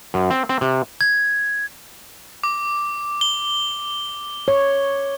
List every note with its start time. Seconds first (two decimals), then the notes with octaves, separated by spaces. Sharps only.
0.14 F#2
0.30 C4
0.49 C4
0.61 C3
1.01 G#6
2.44 D6
3.21 G7
4.48 C#5